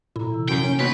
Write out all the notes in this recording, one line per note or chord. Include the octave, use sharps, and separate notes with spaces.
A#2 E4 A4 A#5
C3 E3 E6
F#2 G5
A#3 C#4 D#4
B2 D#3 B4 C6